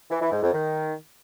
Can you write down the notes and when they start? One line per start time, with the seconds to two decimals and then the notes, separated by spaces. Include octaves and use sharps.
0.10 E3
0.21 E3
0.32 G#2
0.43 F2
0.54 D#3